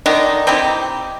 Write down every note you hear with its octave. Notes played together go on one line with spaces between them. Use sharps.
D3 D#3 D4 D#4
C4 D#4 E4 G4